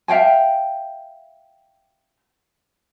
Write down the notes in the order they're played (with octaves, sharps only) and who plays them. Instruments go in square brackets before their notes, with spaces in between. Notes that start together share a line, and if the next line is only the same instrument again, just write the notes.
[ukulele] E5 F5 G5 G#5